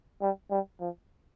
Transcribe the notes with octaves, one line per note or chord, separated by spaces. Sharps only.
G3
G3
F3